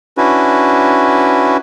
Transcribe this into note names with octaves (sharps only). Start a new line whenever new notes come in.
C#4 D4 E4 F#4 B4